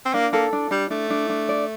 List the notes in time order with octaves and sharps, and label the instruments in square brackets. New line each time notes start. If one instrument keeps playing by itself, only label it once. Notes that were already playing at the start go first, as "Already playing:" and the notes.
[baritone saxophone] C4
[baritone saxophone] A#3 [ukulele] D4
[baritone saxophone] A#3 [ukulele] A4
[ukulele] D4
[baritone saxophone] G3 [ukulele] D4
[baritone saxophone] A3 [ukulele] D4
[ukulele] D4
D4
D5